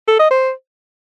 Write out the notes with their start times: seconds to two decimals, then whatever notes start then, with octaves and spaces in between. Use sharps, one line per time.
0.08 A4
0.19 D#5
0.31 C5